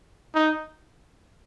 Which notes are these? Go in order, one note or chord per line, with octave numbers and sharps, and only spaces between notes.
D#4